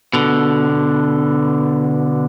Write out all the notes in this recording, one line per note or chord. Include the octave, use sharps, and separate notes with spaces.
B2 D3